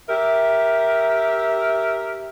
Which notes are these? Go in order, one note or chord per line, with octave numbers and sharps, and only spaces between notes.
G4 A#4 E5